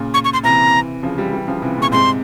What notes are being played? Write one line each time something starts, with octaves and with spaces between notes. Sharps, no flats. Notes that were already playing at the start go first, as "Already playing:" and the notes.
Already playing: A#2 C#3
C#6
C#6
C6
C3 E3 A#5
C#3 F3
E3 G3
E3 G3
C#3 F3
C3 E3
A#2 C#3 C#6
G#2 C3 C6